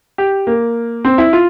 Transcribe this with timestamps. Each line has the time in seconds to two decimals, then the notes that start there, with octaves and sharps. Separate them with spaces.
0.18 G4
0.47 A#3
1.05 C4
1.18 E4
1.33 F4